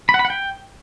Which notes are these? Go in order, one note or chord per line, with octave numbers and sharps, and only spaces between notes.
B5
F#5
B5
F#5
G5